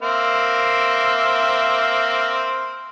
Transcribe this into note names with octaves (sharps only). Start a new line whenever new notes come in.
A#3 C4 E5